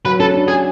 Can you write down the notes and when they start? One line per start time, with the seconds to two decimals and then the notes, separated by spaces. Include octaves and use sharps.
0.05 F#3 B4
0.19 C#4 A4
0.34 D4
0.48 G#4